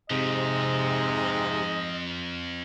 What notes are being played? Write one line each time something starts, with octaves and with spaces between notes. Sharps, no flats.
F2 G#2 C3 F3 D#5